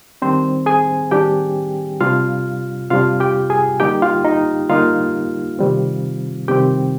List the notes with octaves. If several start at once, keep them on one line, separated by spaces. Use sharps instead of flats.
D#3 G3 C4 D4 C5
G#4 G#5
D#3 G3 D4 G4 G5
C3 G3 D4 F4 F5
C3 G3 D4 F4 F5
G4 G5
G#4 G#5
D3 G3 A#3 D#4 G4 G5
F4 F5
D#4 D#5
D3 G3 A#3 D#4 F4 F5
C3 D#3 G3 C4
C3 D#3 G3 C4 G4 G5